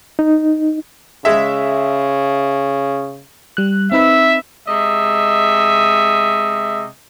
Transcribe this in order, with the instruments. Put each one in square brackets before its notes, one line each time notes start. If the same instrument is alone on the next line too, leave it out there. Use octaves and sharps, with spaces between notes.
[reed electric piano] D#4
[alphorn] C#3 [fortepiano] G#3 E5
[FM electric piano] G3 F#6
[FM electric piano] C4 D#4 B4 [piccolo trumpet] E5
[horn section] C3 G#3 D#5 E5